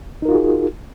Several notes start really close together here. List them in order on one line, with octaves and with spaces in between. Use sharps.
D#4 A#4 F4 F#4 G#4